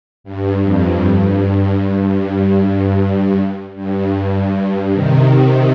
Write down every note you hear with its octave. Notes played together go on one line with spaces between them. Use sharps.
G2
F2
G2
G2
G2
G2
G2
C3 D#3